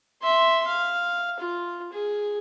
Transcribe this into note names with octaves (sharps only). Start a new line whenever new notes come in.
E5 C6
F5
F4
G#4